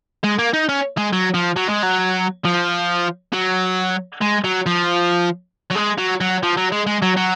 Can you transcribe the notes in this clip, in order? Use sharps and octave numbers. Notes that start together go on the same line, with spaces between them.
G#3
A#3
D#4
C#4
G#3
F#3
F3
F#3
G#3
F#3
F3
F#3
G#3
F#3
F3
F#3
G#3
F#3
F#3
F3
F#3
G#3
G#3
F#3
F#3